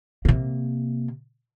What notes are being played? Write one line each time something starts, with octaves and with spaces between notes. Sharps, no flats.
C3 A#3